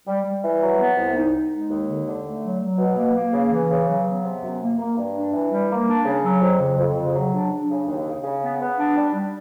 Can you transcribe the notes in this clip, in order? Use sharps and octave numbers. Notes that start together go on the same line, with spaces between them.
G3
G3
E3
F#3
B3
C2
D#4
D#4
G#3
D#2
D3
D3
A3
F#3
F#3
B2
A#3
A#3
C#3
E3
C#3
F#3
B3
C3
F#2
A#3
A#3
G2
D4
E3
G3
A#3
D4
C#3
F#3
F2
C#3
F2
C#3
F#3
D4
D4
C#3
D#2
C#3
C#3
B3
B3
D4
G3
G3